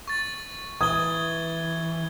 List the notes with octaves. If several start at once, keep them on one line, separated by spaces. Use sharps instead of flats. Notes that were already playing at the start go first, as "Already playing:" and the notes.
C#6 A6
E3 D#6 G#6 G7